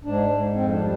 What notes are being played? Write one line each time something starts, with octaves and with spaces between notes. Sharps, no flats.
G#2 D4
G#2
F2 C4
D4
G3